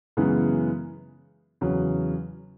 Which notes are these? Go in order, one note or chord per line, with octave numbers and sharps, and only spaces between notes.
F#2 C#3 E3 G#3 B3
E2 C#3 F#3